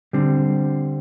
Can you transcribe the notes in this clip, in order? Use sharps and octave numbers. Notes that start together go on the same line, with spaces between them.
D3 G3 C4